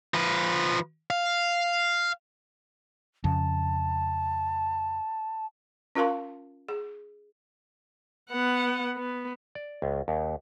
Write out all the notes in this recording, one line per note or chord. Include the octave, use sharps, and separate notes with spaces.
F3 B4
F5
F2 C#3 A5
C#4 F4 A#4 F5 A5 C6
G#4
B3 F#5
B3
D5
C#2
D#2